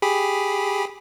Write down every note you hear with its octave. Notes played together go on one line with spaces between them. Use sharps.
G4 G#4 B5